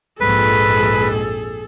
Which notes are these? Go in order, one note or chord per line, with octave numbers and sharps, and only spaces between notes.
A#1 F2 G#2 G#4 A4 B4